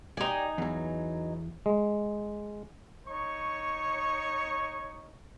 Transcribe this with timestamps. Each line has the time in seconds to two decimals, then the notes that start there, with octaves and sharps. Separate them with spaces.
0.17 D#4 G4 D5 G#5
0.58 E2 E3 F#3
1.66 G#3
3.07 D#4 C#5 C#6